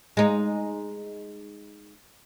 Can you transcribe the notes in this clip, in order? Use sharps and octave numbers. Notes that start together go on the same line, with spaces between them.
G#3 D#4